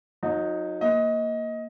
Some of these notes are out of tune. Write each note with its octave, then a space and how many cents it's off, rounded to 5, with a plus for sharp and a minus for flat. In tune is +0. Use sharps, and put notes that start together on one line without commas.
F#3 -35 D#4 +0
A#3 -5 D#5 +20